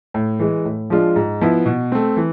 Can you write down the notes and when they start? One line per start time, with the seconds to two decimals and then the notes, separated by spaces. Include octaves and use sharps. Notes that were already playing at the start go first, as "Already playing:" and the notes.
0.14 A2
0.39 E3 G#3
0.65 A2
0.90 F3 G#3 D4 F4
1.16 G#2
1.41 F3 B3 E4
1.66 B2
1.92 A3 C4
2.17 E3